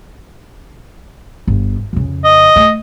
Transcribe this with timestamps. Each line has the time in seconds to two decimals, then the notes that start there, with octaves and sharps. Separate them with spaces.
1.47 G1
1.93 F2 C#3
2.25 D#5
2.56 A3